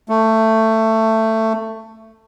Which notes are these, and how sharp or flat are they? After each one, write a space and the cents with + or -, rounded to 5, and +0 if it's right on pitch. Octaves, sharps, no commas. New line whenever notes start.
A3 +15